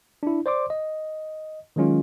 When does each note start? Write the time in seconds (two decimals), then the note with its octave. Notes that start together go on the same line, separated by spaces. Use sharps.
0.23 D4 E4
0.46 C5 D5 C6 D6
0.70 D#5
1.76 D#3 F#3 G#3 C#4 F4